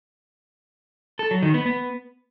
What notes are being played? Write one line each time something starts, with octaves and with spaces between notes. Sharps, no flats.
A4
F#3
D#3
B3
B3